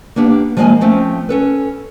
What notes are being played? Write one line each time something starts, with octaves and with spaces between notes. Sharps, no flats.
A#3 B3 D4 G4
F3 G#3 A#3 B4 D#5 G#5
F3 A3 C4 C#4
C#4 A4 B4